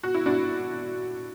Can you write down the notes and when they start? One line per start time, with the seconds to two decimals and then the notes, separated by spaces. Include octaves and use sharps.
0.03 F#4
0.14 E4
0.26 D4 F#4